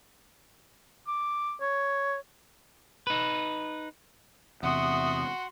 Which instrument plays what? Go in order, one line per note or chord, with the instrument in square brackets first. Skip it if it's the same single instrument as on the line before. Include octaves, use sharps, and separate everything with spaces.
[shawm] D6
C#5
[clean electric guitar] D#4 B4
[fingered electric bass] E2 C3 [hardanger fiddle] F#4 C6 [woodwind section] E5 D#6 [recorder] F#5